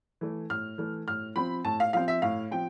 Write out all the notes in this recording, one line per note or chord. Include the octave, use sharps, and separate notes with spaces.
E3 A3
A2 F6
E3 A3
A2 F6
F3 C4 B5
A2 A5
F5
F3 C4 F5
E5
A2 F5
F3 C4 G5